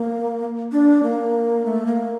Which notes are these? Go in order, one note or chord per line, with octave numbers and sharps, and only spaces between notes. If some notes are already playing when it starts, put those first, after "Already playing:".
Already playing: A#3
D4
A#3
A3
A#3